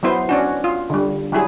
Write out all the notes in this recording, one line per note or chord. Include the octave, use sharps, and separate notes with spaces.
F#3 B3 E4 C5
C#4 D4 F#4
F4
D3 G3
F#3 G3 E4 G#4